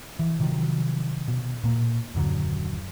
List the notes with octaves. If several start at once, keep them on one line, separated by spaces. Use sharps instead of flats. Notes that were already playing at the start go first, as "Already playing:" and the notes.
E3
C3 D#3 F3 F#3
B2
A#2 A#3
D#1 F#2 D3 F#3